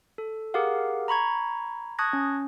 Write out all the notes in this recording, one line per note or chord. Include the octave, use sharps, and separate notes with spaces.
A4
G4 G#4 A#4 F5 F#5
A#5 B5 C#6 G#6
A5 C#6 D#6 F#6 G#6 A#6
C#4